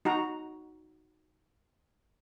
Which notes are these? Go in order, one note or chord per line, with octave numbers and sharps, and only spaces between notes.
D#4 F#4 A#5